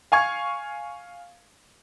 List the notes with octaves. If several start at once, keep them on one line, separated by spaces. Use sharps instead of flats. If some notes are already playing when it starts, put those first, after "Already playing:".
F5 G#5 C#6 G#6